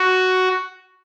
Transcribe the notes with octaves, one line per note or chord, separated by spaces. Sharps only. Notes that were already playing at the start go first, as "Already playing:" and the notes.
Already playing: F#4